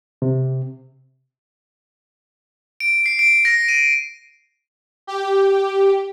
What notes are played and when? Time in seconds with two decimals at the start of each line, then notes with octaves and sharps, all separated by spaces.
0.22 C3
2.80 D7
3.06 C7
3.19 D7
3.45 A#6
3.69 D#7
5.07 G4